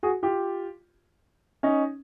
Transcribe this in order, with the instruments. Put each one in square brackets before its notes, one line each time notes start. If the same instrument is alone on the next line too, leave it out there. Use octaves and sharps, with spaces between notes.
[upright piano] F#4 G#4
F4 G4
C#4 D#4